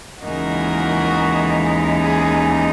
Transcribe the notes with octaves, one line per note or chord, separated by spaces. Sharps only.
D#2 C#3 E3 G#3 D#4 F#4 A#4
G#4